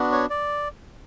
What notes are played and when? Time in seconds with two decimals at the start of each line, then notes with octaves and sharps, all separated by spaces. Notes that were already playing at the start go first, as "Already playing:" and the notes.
Already playing: B3 D4 F#4
0.12 C#5
0.30 D5